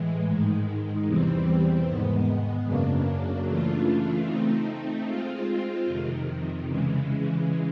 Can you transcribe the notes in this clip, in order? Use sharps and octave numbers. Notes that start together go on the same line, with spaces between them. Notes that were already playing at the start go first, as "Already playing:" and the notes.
Already playing: A2 E3 G#3
G#2 D#3 G#3
E2 C3 E3 G3 C4
G#2 D#3 G#3 B3
F#2 C#3 F#3 A#3 D4
C#3 E3 A3 D4 F4
A3 C4 D#4
G#3 C4 F4
F2 C3 D#3
C#3 E3 G#3